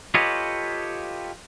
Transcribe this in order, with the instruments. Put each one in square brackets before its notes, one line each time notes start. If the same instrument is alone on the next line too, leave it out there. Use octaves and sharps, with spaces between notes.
[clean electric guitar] F4 G4 A4 B4 C#5 D#5